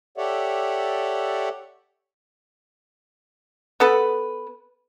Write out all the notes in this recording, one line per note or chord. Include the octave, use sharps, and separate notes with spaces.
G4 A4 C#5 D5 E5 F#5
B3 A4 B4